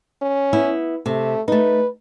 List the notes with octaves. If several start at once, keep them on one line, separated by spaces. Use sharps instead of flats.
C#4
B3 E4
C3 A3
A3 D#4 B4